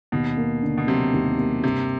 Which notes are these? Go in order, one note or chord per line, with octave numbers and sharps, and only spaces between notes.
D#2 B2
A#3
D3
B2
C3 F#3
D#2
A#3
G2 C3